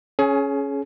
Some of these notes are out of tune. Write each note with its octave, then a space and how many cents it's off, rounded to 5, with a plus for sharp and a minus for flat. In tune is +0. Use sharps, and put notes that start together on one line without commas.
C#4 +0 G#4 +30